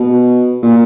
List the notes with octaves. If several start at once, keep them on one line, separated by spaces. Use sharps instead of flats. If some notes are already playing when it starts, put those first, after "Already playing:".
Already playing: B2
A#2